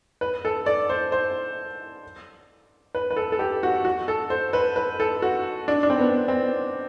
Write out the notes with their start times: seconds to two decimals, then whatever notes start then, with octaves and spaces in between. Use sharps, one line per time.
0.21 B4
0.45 A4
0.66 D5
0.89 C5
1.12 C5
2.95 B4
3.11 B4
3.16 A4
3.32 A4
3.39 G4
3.63 F#4
3.85 F#4
4.08 A4
4.30 C5
4.53 B4
4.76 B4
5.00 A4
5.22 F#4
5.68 D4
5.83 D4
5.90 C4
5.98 B3
6.28 C4